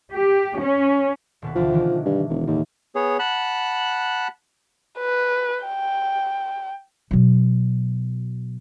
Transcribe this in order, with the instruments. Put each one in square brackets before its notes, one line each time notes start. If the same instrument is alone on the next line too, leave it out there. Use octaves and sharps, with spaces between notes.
[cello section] G4
C#4
[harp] D#1 B2 B4
[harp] D2 E3 A5 [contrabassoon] F3
[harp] D#3 E3 G#3
[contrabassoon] G2
E1
[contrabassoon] D#2 [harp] A2
[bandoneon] B3 G#4 C#5
F#5 A5 B5 F#6
[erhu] B4
G5
[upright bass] B2 F#3